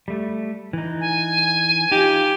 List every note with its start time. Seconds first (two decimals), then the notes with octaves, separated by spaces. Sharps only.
0.08 G3 A3
0.73 E3 D#4
1.01 G#5
1.92 D#4 F4 G4